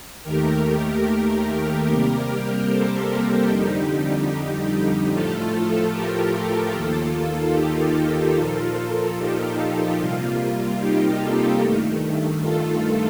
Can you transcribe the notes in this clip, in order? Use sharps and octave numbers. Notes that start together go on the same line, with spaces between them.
D#2 D#3 A3 G4 A#4
C3 G3 A#3
A4 C5
A4 C5
F2 D3 G3 D#4 G4
A2 F3 A3 F4 A4
G4 A#4
D#2 D#3 A#3 F4 A4
D#4 G4
F4 A4
A#2 F3 A#3 F4 A4
F4 A4
D#4 G4
C3 G3 A#3 F4
D#4 G4
F4 A4
G2 D#3 A3
F4 A4